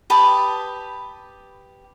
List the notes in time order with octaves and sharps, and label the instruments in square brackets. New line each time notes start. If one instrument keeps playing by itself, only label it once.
[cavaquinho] G4 B4 A5 D#6